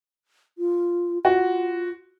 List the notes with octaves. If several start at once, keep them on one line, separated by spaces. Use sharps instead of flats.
F4
F4 F#4